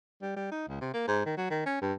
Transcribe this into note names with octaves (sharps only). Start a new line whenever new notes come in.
G3
G3
D#4
C#2
C3
A#3
G#2
D#3
F#3
D#3
C#4
G2